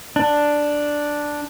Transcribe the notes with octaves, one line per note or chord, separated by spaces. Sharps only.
D4